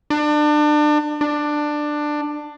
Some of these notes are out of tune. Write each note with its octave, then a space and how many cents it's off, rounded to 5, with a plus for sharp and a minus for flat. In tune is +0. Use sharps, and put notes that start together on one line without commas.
D4 +30
D4 +15